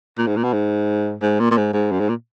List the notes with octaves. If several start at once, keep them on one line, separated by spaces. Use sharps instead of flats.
A#2
G#2
A#2
B2
G#2
G#2
A#2
A#2
G#2
G#2
F#2
G#2
A#2